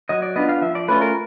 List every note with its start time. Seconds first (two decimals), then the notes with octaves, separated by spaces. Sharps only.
0.09 F#3 D#5
0.22 D5
0.36 B3 D4 F4 D#5
0.49 F5
0.62 F3 E5
0.75 D5
0.88 A3 C#4 F4 B4
1.01 A#4